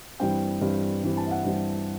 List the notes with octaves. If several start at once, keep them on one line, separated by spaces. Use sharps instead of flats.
G2 E3 G3 C4 G5
G2 E3 G3 C4
G2 E3 G3 C4
A5
E5
F#5
G2 E3 G3 C4